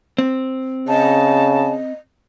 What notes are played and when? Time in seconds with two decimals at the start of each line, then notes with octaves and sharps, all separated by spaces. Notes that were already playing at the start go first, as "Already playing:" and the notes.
0.18 C4
0.88 C#3 D#5 A5